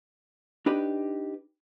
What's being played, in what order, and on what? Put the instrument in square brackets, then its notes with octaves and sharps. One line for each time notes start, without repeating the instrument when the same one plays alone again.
[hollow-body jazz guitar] D4 D#4 G4 B4